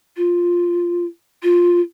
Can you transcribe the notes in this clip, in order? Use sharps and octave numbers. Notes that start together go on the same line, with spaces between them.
F4
F4